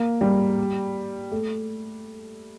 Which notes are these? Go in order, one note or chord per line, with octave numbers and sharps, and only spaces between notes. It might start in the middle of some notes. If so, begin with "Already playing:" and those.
Already playing: A#3
G3
A3